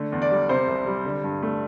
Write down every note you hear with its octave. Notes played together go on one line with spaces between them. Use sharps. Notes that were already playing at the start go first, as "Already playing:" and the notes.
Already playing: D3 A3
E2
D5
G3
C3 C5
C2
G3
D3
G2
A3